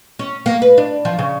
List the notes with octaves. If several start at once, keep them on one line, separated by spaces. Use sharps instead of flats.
C#4
A#3
B4
D4
F3
C#3